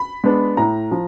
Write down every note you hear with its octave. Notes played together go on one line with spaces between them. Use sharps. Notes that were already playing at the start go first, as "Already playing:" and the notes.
Already playing: B5
G#3 B3 D4
A2 A#5
F3